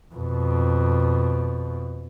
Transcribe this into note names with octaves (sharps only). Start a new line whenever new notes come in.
F2 B2